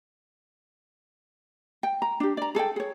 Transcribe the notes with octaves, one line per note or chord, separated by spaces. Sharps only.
G5
A#5
D4 G4
D5 A#5
G#4 A4 D5 G5
G#4 C#5